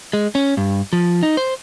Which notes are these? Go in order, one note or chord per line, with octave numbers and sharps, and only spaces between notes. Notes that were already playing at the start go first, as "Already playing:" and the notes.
G#3
C#4
G2
F3
D#4
C5